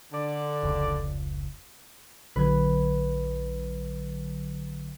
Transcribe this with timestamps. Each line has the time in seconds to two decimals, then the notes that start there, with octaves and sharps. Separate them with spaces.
0.12 D3 D5
0.63 F1 C#2
2.36 A#1 D3 F#3 B4 G#6